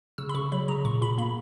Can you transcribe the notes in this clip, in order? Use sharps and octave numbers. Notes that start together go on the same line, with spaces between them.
C#3 E6
B5
C#3 C#6
F#3 B5
C#3 A#5
A#2 C#6
A#2 B5
A#3 B5